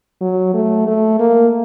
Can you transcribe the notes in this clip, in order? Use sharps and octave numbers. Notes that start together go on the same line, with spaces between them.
F#3
A3
A3
A#3